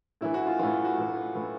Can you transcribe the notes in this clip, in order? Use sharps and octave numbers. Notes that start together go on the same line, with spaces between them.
A2 E3 E4
F#4
F4
A2 E3 F4
F#4
A2 E3
A2 E3